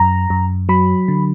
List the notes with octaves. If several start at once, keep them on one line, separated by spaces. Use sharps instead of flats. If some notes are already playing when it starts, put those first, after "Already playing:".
Already playing: F#2 A#5
F#2
F#3 B5
D3